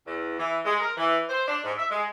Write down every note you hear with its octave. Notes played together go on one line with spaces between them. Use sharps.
E2
E3
G#3
A#4
E3
C5
D4
G#2
E5
G#3